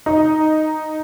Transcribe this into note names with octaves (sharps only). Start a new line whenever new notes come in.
D#4